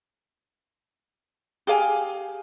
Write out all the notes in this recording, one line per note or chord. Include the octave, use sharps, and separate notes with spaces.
G4 G#4 F5 G#5